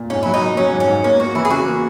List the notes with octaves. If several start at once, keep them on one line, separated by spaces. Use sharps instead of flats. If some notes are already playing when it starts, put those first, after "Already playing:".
Already playing: A#2
G#2 C#4
F#3 E4
D#4
A#3
F#3 C#4
G#2
C#4
G#2
A#3 C#4
A#3 F#4
E3 E4
G#4
C#3 F#4
A#3